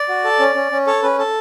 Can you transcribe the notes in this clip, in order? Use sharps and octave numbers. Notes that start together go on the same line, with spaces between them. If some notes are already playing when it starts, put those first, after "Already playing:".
Already playing: D5
F#4
A4
C#4
C#4
C#4
A4 C#5
C#4 B4
A4